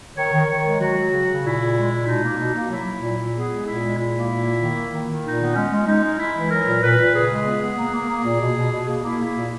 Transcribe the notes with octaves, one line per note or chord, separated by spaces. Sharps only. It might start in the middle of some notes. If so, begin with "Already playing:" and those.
D#3 C#5
D#3
D#3 C#5
G#3
F#3 F#4
F#3
C#3
C#3
A#2 E4
A#2
G#3
A#2
B2 D#4
A#3
B2
A#3
F#3 E4
F#3
A#2
A#2
B3 G#4
G#3
A#2 E4
G#3
A#2 E4
A#3
A#2
A#3
D#3
A#3
D#3
D#3
A#2 D#4
B3
G#3 C#4
G#3
G#3 D#4
G#3
G#3 E4
E3
F#3 A#4
A#2
A#2 B4
A#2
C#3 G#4
G#3
B3
B3
A#3
A#3
A#3
A#2
B2
B2
B2
A#3
A#3 E4
A#3 E4
A#2